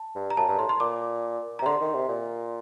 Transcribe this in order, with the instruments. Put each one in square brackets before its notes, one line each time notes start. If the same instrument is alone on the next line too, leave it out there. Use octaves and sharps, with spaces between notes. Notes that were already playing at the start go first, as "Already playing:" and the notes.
Already playing: [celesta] A5
[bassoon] G2
[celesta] A#5
[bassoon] F#2 [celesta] A5
[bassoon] G2
[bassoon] A2 [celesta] C6
[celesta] C6
[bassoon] A#2 [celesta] D6
[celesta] A#5
[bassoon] C3
[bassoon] D3 [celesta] C6
[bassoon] D#3
C3
A#2